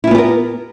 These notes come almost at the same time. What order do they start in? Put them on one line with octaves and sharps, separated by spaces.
E4 F4 B3 G4 A#4